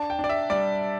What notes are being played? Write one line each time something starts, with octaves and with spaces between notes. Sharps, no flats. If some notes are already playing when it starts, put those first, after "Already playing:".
Already playing: D4 A5
G5
D4 D5
E5
G3 D5